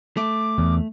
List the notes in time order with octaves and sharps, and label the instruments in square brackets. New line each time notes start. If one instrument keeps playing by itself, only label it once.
[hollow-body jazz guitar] A3 [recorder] D6
[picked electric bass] E2